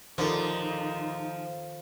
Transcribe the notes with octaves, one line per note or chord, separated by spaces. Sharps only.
D#2 A#2 D3 D#3 F3 D#4 A4